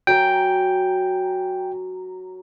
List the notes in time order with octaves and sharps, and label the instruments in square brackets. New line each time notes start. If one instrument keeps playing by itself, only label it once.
[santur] F#3 A#4 G#5 [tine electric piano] G5